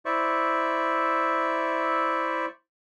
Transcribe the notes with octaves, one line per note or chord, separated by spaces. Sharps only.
E4 C5 D5 E5 C#6